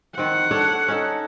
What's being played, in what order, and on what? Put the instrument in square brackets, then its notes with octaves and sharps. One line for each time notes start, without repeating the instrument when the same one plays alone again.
[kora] D#3 C4 [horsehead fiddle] F#5
[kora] D4 A4 C#5
C#4 D#4 A4